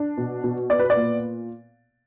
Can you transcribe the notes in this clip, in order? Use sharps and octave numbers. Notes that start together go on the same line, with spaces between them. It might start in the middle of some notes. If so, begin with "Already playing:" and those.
Already playing: D4
B2
B2
B3 D5
B4
D5
A#2